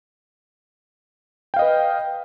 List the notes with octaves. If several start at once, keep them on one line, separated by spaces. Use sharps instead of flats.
B4 D#5 F5 G5